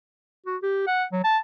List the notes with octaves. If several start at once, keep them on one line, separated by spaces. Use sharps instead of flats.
F#4
G4
F#5
F#3
A5